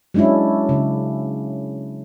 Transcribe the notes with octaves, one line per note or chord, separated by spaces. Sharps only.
F#3 G#3 C#4 D4 E4
C#3